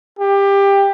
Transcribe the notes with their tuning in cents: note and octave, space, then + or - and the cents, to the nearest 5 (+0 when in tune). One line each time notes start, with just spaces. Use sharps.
G4 +20